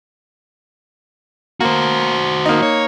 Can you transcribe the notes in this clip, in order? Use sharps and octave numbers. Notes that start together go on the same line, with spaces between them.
A#3 F#4 C5
A#3 D#4
C#5